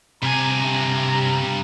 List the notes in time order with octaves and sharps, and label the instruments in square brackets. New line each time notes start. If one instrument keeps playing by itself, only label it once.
[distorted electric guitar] G2 G#5 [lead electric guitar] C3 [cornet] A#5